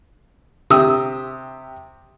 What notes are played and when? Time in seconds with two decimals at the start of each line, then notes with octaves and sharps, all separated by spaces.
0.70 C3 G4 D#6 E6